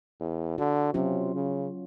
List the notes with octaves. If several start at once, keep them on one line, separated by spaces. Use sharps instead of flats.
E2
D3 F#4
C3 F#3 C#4 F4
C#3